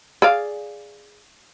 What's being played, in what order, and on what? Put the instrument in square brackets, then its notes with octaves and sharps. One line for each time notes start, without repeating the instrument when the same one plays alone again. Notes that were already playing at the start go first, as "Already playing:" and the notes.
[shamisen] G#4 D5 F5